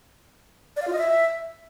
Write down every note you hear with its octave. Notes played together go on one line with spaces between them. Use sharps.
D5
F5
F4
D#5
E5